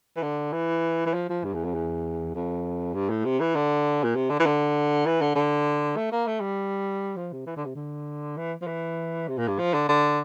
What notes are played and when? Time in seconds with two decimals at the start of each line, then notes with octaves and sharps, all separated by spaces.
0.17 E3
0.23 D3
0.53 E3
1.06 E3
1.14 F3
1.29 F3
1.44 G2
1.54 E2
1.64 F2
1.74 E2
2.35 F2
2.94 G2
3.10 A2
3.25 C3
3.40 E3
3.55 D3
4.04 A#2
4.16 C3
4.30 D3
4.39 E3
4.46 D3
5.06 E3
5.21 D3
5.35 D3
5.97 A3
6.12 A#3
6.27 A3
6.41 G3
7.16 F3
7.32 C3
7.46 E3
7.56 D3
7.65 C3
7.75 D3
8.37 E3
8.62 F3
8.67 E3
9.28 C3
9.38 A#2
9.48 G2
9.59 F3
9.74 D3
9.89 D3